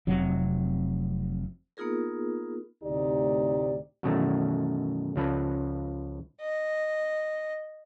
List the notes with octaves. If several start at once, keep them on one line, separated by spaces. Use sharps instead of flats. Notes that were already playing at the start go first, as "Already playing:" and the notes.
F1 C3 F#3
A#3 B3 D#4 F4 G#4 A#4
D2 A2 C3 D#4 G4 D5
F#2 B2 D#3 E3 A3
C#2 F3 A4 B4
D#5